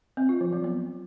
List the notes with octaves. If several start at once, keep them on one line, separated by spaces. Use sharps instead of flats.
C4
F4
F3
F#3
B3